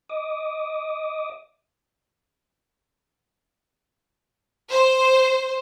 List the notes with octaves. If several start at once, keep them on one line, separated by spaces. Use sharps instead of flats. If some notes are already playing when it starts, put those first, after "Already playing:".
D#5 D6 D#6
C5